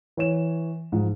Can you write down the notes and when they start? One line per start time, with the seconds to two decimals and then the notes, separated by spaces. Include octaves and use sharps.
0.17 E3 C#5 E7
0.92 G#2 F3